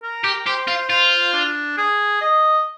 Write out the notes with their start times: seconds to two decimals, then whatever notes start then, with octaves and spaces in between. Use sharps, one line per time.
0.03 A#4
0.24 G4
0.46 G4 C5
0.68 F4
0.90 F4 C5
1.33 D4
1.77 G#4
2.21 D#5